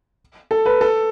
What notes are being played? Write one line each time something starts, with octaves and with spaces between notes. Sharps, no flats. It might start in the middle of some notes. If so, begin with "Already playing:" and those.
A4
B4
A4